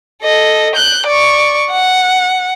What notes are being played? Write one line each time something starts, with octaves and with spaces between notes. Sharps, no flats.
A4 D#5
F#6 G6
D5 C#6
F#5